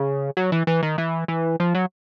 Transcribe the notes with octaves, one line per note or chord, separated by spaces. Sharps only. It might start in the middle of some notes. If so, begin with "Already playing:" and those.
Already playing: C#3
F#3
E3
E3
D#3
E3
E3
F3
F#3